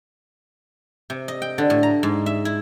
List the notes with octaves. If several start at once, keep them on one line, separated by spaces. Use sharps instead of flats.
C3
D#5
G5
D3
A2
A#5
G#2
E5
E4